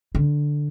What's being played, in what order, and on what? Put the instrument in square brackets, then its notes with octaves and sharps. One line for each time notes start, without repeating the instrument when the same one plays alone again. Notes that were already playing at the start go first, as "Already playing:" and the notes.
[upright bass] D3